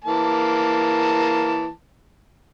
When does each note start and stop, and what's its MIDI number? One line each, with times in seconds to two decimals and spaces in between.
0.04 1.70 52
0.04 1.70 58
0.04 1.70 81